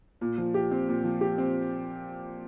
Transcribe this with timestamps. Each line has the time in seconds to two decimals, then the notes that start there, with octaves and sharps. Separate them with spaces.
0.21 A#2
0.38 F3
0.54 G4
0.71 C4
0.89 A#2
1.04 F3
1.21 G4
1.38 C4